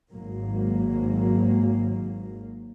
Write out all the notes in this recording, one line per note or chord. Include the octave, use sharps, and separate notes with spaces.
G#1 G#2 F#3 A#3